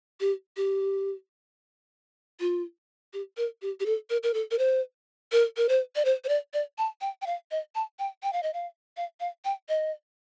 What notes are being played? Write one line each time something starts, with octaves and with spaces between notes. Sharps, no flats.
G4
G4
F4
G4
A#4
G4
G4
A4
A#4
A#4
A4
A#4
C5
A#4
A#4
C5
D5
C5
C5
D5
D5
A5
G5
G5
F5
D#5
A5
G5
G5
F5
D#5
F5
F5
F5
G5
D#5